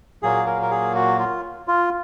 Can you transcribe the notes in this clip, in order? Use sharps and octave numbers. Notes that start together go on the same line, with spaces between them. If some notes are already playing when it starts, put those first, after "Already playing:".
A#2 F#3 A#3 G#4
A#4
A#4
G#4
F#4
F4
F4